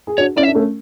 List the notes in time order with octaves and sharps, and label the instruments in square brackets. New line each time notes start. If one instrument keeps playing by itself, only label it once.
[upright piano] G#4
[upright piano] D4 F#4 [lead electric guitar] C#5
[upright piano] C#4 E4 [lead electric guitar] D5
[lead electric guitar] E5
[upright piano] D4
A3 C#4